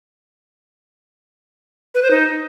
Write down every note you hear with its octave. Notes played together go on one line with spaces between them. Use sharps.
B4
C5
D#4